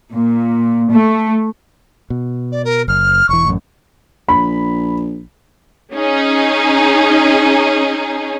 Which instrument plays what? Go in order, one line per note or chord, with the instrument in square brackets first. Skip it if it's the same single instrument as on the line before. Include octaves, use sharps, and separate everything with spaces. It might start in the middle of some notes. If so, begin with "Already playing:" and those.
[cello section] A#2
A3
[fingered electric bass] B2
[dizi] D5
A#4
[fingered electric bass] F#1 [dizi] F6
[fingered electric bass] E1 E3 [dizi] C#6
[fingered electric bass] A1 F#2
[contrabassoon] A#1 [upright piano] B5
[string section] C#4 D#4 G#4